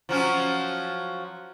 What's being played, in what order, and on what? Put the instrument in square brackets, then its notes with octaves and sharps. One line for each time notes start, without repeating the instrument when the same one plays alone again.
[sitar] F3 F#3 C#4